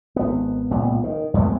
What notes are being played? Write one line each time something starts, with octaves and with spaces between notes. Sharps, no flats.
G#1 B3
C#2 A#2 B3
D#3
F2 A2 G#3 B3